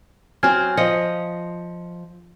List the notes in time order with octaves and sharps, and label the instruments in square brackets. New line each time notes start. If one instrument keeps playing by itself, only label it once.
[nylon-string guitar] F#3 C4 F#4 [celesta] G#5 F6 G#6
[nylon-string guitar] F3 D#5 [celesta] C#7